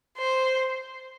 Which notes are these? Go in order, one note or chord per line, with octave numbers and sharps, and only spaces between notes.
C5